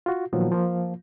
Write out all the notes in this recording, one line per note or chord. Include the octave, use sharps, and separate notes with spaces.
F4 F#4
A#2 D#3 F3 F#3 B3
F3 A#3 F4